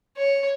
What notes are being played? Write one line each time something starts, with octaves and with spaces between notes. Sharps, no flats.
C#5